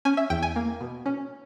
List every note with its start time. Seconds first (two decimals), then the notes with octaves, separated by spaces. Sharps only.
0.05 C#4 G#5
0.17 E5
0.30 E2 G5
0.43 G#5
0.56 A#3
0.81 B2
1.06 C#4